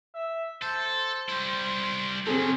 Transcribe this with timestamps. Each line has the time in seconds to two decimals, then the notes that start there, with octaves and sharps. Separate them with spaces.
0.15 E5
0.62 A4 C5
1.29 G3 E4
2.27 C#3 F#3 C4 G#4 A4 C5